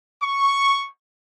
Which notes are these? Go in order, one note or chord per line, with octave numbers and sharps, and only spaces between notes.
C#6